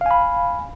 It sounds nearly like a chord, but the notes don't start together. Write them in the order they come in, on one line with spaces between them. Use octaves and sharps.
F5 G#5 B5